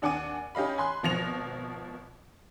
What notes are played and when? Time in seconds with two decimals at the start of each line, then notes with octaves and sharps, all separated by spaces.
0.02 D#2 D4 F#5 G#5 D6 D#7
0.55 C#4 G4 D#5 F5 B5
0.78 G#5 B5 C6 F#6
1.03 G#1 B2 F3 A#6 C#7 F7